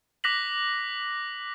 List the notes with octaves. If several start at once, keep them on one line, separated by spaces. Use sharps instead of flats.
D6 F#6 A#6 B6 F#7